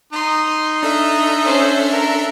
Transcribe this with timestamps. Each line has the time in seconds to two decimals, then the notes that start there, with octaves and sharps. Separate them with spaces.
0.13 D#4 C6
0.83 D4 A4 E5
1.44 C#4 C5
1.89 A#4